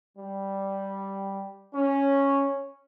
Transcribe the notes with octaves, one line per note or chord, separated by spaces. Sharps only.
G3
C#4